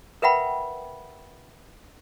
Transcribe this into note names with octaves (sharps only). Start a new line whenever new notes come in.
A#4 B4 E5 F#5 G5 B5